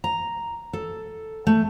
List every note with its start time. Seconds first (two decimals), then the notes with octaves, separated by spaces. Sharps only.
0.04 A#5
0.73 A4
1.47 A3